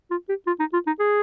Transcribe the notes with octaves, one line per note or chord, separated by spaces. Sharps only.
F4
G4
F4
D#4
F4
D#4
G#4